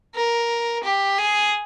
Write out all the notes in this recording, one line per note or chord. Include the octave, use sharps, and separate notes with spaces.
A#4
G4
G#4